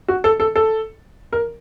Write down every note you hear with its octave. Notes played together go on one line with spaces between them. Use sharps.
F#4
A4
A4
A4
A#4